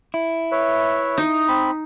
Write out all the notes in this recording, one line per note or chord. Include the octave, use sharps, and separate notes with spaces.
E4
B4 C#5 E5
D#4
C4 B5